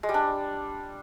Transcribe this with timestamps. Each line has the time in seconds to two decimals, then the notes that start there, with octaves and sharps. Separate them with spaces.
0.03 G#3
0.09 G3
0.14 D4